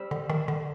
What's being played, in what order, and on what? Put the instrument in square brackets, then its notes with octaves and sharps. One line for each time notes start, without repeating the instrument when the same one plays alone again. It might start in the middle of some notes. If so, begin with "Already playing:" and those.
Already playing: [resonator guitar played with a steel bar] G3 C4
[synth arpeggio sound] D3
D#3
D3